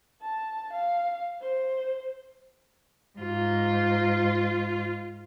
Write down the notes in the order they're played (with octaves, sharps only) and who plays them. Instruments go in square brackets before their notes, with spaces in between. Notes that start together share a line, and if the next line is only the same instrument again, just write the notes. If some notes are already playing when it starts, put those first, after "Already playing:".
[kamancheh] A5
F5
C5
[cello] G#2 F4